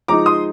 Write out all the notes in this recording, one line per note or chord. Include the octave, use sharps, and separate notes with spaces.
F3 G#3 D#4 A#5 D6
C6 D#6